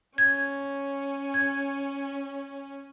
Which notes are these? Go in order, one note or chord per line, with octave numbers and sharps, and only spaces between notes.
C#4 G#6
G#6